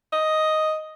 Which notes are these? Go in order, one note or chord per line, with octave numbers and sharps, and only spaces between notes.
D#5